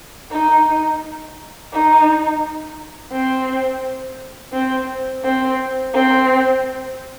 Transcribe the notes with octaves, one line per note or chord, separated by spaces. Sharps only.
D#4
D#4
C4
C4
C4
C4